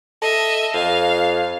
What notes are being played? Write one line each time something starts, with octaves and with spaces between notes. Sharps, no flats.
A4 D#5 E5
F2 F5